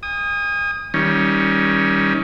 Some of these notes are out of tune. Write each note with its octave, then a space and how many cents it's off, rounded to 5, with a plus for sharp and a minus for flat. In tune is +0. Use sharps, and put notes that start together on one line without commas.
G#5 -45 D#6 +0
D#3 +30 G3 +0 C#4 +0